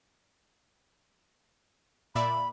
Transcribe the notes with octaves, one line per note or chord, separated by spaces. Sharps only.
A#2 D5 E5 B5